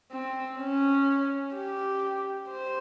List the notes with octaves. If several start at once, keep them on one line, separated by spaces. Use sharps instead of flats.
C4
C#4
G4
C5